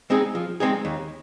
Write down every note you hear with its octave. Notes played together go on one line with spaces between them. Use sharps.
G#3 C4 D#4 G#4
F3
G#3 C4 D#4 G#4
D#2